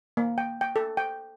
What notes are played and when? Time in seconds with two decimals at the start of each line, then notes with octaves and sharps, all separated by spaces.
0.17 A#3
0.38 G5
0.61 G5
0.76 A4
0.97 G5